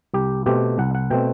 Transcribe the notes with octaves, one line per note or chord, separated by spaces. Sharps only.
C2 G4
B2 A3 C4 G4
C2 F#5
F#5
B2 A3 C4 G5